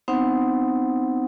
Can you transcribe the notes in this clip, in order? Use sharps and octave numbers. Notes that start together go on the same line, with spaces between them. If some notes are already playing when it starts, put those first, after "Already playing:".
B3 C4 D#4 C5 F#5